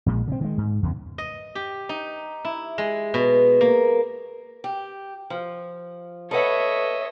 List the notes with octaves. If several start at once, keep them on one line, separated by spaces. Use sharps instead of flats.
A#1 A#2 G#3
C#3 C4
D#3 G#3
G#2
E2 C#3
D#5
G4
D#4
E4
G#3
B2
A#3
G4
F3
A4 B4 C#5 D#5 E5 F#5